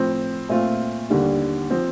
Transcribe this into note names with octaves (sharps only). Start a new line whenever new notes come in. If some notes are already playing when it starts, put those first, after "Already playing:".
Already playing: A2 F3 C4
A#2 A3 C4 F4
D#2 D3 G3
F3 C4